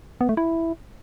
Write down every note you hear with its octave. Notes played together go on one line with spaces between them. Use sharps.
B3
A3
E4